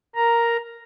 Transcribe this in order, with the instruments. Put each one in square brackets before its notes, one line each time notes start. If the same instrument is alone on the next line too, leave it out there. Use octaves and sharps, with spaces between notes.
[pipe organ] A#4 A#5